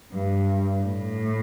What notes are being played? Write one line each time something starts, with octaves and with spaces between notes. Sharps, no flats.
G2
A2